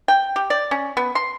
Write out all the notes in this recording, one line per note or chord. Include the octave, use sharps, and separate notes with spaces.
G5
G4
D5
C#4
B3
C6